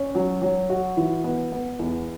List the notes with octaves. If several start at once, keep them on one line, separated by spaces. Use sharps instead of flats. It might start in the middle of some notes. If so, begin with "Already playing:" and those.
Already playing: C#4
F#3
F#3
F#4
E3
B3
B3
E2